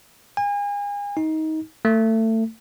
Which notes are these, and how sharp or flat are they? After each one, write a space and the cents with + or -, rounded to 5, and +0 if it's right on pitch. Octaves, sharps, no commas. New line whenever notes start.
G#5 -35
D#4 +20
A3 +25